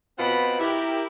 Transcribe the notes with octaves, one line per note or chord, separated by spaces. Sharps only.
B2 C4 F4 B4 F#5 B5
E4 G4 A#4